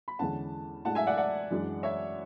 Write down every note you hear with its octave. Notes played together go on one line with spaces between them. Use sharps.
B5
E2 D3 G#3 C#4 E4 F#5 A5
A2 G#3 D4 F#5 A5
E5 G#5
D5 F#5
D5 F#5
F#2 E3 G#3 D4
C#5 E5